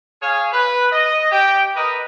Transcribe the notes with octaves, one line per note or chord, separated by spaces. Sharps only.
G#4 C#5 F5 G#5
B4
D#5
G4 G5
A#4 B4 D#5